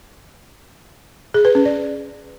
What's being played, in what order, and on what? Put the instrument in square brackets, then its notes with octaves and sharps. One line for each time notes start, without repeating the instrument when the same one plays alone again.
[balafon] G#4
B4
C#4
D5